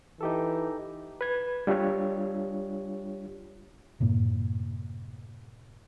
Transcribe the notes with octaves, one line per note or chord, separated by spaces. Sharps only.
E3 D#4 G4 A4
B4 G#6
G3 D4 F4 G4 C#5
F#2 A2 C3 A#3